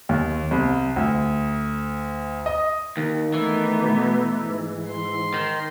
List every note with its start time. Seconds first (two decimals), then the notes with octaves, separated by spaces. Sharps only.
0.09 D#2
0.51 C2
0.96 D2
2.46 D#5
2.97 D#2 D#3
3.33 E3 A3 B3 D#4
3.83 B2
4.44 G#2
4.89 C6
5.34 D#3